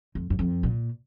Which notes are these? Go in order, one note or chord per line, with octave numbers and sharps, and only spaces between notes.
F2
F#2
F2
A#2